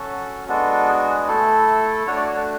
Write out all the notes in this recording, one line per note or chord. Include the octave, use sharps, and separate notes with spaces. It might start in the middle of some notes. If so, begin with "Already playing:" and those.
Already playing: F#3 C#4 F#4 A4
G#3 B3 D4 F#4 A4
G#4
A3 E4 A4
A3 D4 F#4 C#5
D5
C#5
A5